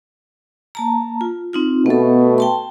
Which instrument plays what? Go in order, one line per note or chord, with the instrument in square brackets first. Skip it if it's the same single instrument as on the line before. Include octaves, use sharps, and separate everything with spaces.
[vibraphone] A#3 A5 A#5
F4
C4 D#4 F4
[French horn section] B2 A3 [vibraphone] B3 A4
[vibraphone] G5 A5 C6